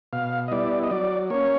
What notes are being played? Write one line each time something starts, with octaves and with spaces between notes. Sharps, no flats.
B2 F5
D#5
G3 B3 E4 D5
D#5
F#3 D5
A#3 C#4 C#5